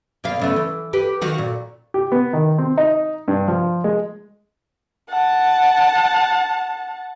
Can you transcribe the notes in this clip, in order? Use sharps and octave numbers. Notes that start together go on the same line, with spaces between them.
B2 A#3 F5
C#3 A3 B3
E3
G4 B4
D#3 F#4 F5
A#2
G4
B3
D#3
C4
D#4
G2
F3
G#3
F#5 A5